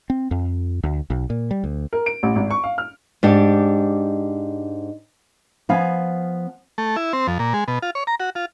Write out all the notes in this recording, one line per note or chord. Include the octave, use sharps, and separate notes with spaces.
C4
F2
D2
B1
A#2
G3
D2
A#4
D7
A1
G#1
C#6
F5
F6
G#2 D4 G4
F3 B3 F5 G#5
A3
E4
C4
F2
A#2
G#3
B2
F4
C#5
A#5
F#4
F4